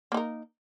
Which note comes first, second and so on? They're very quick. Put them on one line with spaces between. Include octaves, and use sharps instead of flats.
A#3 D#4 A#4